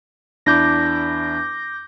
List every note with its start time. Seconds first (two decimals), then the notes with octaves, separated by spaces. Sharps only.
0.46 E2 D4 E4 D6 G6 A#6